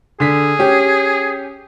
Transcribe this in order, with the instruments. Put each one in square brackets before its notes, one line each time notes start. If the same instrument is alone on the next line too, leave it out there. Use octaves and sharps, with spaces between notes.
[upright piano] D3 B6 [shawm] G#4
[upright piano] C#4 G4